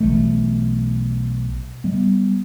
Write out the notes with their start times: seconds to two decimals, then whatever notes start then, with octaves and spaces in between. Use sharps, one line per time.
0.01 B1 E3 A3
1.84 G3 B3